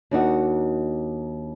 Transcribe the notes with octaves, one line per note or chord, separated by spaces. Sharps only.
D#2 D4 D#4 F#4